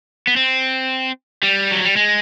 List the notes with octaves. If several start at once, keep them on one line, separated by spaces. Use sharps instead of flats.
B3
C4
G3
F#3
G3
G#3